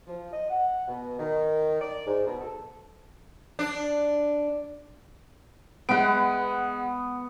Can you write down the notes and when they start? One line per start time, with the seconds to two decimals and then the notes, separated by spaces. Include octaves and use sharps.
0.07 F3
0.33 D#5
0.50 F#5
0.88 B2
1.19 D#3
1.81 D5
2.07 G#2
2.27 B2
2.41 A4
3.59 D4
5.89 G#3 B3 F#5 D7